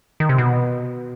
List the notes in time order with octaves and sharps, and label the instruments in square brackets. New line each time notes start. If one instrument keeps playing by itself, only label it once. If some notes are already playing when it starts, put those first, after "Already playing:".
[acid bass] D#3
C3
B2